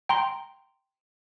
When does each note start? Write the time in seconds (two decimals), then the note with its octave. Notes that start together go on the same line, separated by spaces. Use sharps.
0.09 G5 A#5 C6